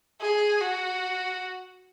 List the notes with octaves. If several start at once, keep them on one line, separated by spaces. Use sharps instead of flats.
G#4
F#4